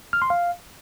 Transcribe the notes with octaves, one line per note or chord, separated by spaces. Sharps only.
F6
C6
F5